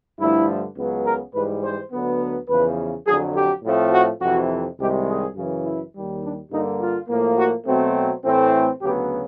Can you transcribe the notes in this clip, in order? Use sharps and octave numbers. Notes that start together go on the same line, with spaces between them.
G2 D3 F3 A3 E4
C#2 C#3 F#3 B3
A#4
G#2 E3 G3 B4
C5
D2 D3 F#3 B3
B4
E2 C#3 F3 B4
F2 D3 F#3 G#4
G4
A2 F3 A3 C4
F#4
F2 C3 E3 F#4
C2 C3 D#3 G#3 G4
G#4
F#2 C#3 E3
E4
D#2 D#3 G3
D4
G2 D3 G3 A#3 D#4
F4
A2 F3 A#3
F#4
B2 F#3 A3 C4
A2 E3 A3 C4
D2 C#3 F#3 B3 G4